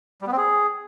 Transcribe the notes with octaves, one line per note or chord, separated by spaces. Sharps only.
G3
B3
C4
G#4